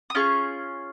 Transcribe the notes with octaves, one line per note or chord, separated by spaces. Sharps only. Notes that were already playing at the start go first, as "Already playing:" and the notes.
D#6
C#4 F4 G#4 C#6